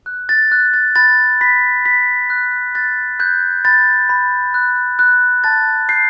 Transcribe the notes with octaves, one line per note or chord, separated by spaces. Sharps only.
F#6
A6
F#6
A6
B5 A6
B5 B6
B5 B6
F#6
F#6 A6
F#6 G6
B5 A6
B5
F#6
F#6
A5 A6
G6 C7